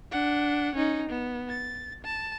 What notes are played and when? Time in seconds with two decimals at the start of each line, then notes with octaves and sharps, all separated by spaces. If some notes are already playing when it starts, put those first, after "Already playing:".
0.12 D4 F#5
0.75 C#4 D#4
1.09 B3
1.49 A6
2.04 A5